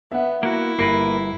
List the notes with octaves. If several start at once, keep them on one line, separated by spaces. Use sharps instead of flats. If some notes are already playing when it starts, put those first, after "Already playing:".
B3 E5 F#5
A#3 E4 F#4
G1 A#3 A#4 B4 C7